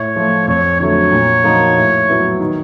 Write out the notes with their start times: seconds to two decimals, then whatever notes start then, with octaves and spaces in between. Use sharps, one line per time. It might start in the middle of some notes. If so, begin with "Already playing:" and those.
Already playing: A2 C#5
0.16 F3 A3
0.48 F2 C#5
0.80 D3 F#3 A3 C#5
1.12 A#2
1.44 F3 A#3 D#4 F#4
1.77 A2
2.08 F#3 B3 E4
2.40 D#3